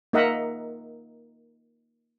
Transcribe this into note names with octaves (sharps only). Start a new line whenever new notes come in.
A#3 D#4 A#4 D#5 E5 F#5